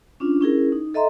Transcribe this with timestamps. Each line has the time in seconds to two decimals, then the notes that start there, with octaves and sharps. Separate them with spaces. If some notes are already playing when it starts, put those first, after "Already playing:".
0.20 C#4 D4 F4
0.41 C#4 E4 G#4 A#4
0.72 D#4
0.94 A4 D#5 E5 A#5 C6